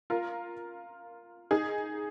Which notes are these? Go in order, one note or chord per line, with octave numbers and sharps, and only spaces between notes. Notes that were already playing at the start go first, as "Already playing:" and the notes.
F4 A#4
D#4 G#4